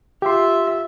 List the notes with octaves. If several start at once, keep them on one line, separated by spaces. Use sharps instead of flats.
F4 G4 E5 C6